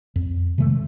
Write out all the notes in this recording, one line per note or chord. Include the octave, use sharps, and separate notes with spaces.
F2
C3 D#3 G#3 A3